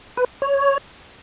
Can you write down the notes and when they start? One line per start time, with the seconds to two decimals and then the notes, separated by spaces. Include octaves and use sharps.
0.17 B4
0.42 C#5